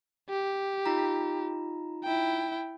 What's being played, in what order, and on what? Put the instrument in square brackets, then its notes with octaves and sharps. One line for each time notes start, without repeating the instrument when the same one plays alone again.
[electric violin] G4
[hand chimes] D#4 F4 A#5
[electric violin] E4 G5